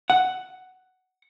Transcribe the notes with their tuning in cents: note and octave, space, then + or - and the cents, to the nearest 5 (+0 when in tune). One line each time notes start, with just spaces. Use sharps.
F#5 +10